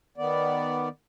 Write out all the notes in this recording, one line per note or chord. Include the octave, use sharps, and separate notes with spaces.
D#3 B3 D5